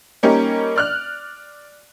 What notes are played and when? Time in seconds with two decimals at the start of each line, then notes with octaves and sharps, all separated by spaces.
0.23 G3 A#3 C#4 D#4 G4
0.76 D5 F6 F#6